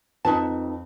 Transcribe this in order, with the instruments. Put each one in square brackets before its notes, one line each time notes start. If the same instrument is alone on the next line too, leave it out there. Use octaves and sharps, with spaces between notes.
[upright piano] F2 [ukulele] D#4 B4 A5